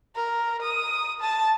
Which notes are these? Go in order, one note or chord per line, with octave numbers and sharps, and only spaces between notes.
A#4
D#6
A5